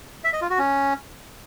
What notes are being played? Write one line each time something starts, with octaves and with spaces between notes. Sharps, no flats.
E5
D#5
F4
F#4
C#4